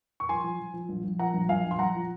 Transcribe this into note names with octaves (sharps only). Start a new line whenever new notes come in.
C#6
F3 G#5 C6
F3
F3
F3
A#1
A#1
F3 F#5 A#5
A#1
A#1 F5 G#5
A#1
C6
A#1 F#5 A#5
F3